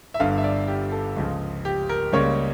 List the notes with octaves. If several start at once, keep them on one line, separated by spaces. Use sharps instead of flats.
E5
G1 G2 D3 F5
E5
D5
G4
A4
C#2 C#3 F3
G4
A#4
C#2 C#3 G3 A#3 C#5